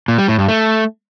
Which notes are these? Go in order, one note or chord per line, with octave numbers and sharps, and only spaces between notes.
A#2
G3
A2
G2
A3